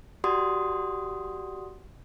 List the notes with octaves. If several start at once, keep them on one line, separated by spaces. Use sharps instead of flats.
F#4 G4 D5 F#5 C6 D#6